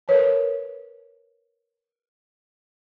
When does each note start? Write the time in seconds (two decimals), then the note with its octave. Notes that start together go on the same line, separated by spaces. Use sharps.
0.08 A#4 B4 C#5 A5